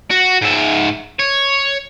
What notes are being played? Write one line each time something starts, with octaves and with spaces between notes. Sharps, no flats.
F#4
G#2 E5
C#5